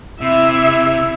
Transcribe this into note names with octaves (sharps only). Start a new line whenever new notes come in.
C3 E4 E5